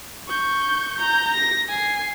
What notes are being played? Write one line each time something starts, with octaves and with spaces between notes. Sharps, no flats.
C#6 G6
A#5 G6
A#6
G#5 C7